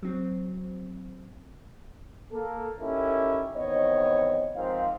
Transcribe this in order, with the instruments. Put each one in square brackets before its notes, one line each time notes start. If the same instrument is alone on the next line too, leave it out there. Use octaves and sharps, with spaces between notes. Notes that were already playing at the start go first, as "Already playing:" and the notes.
[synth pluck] F#3 C4
[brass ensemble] A#3 A4
C#4 D#4 E4 G4 A4 A#4
E2 D#3 B3 C4 C#5 D#5
G#2 F3 C4 A#4 F5